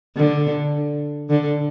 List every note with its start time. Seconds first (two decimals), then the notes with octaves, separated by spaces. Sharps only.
0.17 D3
1.30 D3